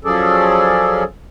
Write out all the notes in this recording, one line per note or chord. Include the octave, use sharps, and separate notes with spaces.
F3 F#3 C#4 G#4 A4 D5